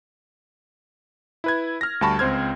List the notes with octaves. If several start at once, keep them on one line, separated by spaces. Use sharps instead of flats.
E4 B4 G#6
F6 A#6
D2 G3 A5 B5 C#6
C#2 C4 C5 F6 G#6